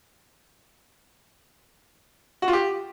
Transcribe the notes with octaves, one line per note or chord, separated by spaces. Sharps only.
F#4
F4
G4